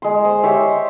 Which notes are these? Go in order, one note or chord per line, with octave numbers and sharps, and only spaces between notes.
G#3 C6
C5
G4 C5 C#5 E5